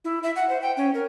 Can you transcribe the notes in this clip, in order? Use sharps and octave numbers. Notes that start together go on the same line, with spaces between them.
E4
E5
F#5
C5
G5
C#4
A#4